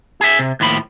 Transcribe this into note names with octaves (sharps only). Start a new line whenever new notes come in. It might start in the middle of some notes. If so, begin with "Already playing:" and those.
G#4 E5
C3
D#2 A2 F3 B5